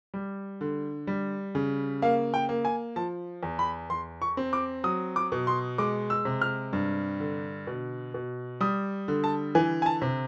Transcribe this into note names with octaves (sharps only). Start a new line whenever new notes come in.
G3
D3
G3
C#3
A#3 F5
G5
A#3
G#5
F3 A5
E2
B5
E2 C6
C#6
C4
D6
F#3 D#6
D6
B2
C6
G#3 D6
E6
C3
F6
G2
D3
B2
B2
G3 D#6
D3
A5
E3 G#5
G#5
A5
C3